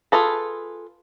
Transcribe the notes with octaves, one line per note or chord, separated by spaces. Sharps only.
F4 G#4 A4 B4